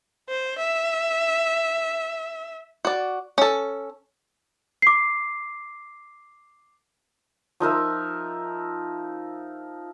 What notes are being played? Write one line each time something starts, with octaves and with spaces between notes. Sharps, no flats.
C5
E5
F#4 D5
C#4 A4
D6 C7
F3 D#4 A#4 E5